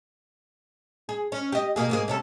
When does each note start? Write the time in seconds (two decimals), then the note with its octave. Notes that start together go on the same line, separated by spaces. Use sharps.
1.09 G#4
1.32 C#4
1.52 G4 D#5
1.76 B2 A#3 G#4
1.89 G#2 A#3 G#4
2.08 C3 C#4 A4